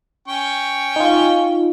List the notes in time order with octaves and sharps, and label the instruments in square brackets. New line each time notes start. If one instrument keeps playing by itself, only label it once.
[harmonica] C#4 G5 C#6
[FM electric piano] D#4 F4